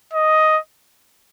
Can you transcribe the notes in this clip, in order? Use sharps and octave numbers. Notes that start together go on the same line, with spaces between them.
D#5